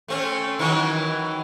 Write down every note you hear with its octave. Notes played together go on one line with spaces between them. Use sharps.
A3 C4 C#4
D#3 E3 F#3